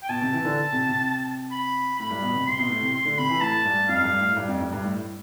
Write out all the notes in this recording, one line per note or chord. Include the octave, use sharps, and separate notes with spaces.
G5
B2 A5
C3
E3
D3
C3
C3
B5
A2 B5
G2
B2
C3
C3 C6
B2
A2
C3
C6
D3
C3 B5
E3
A2 A5
G2
F2 F5
G2
A2
G2
F2
G2
G2
A2